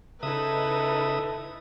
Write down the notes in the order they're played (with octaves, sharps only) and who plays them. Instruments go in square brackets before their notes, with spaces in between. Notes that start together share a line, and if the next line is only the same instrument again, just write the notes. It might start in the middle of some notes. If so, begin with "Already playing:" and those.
[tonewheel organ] C#3 E5 D#6 [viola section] D#4 E4 B4 [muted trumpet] A4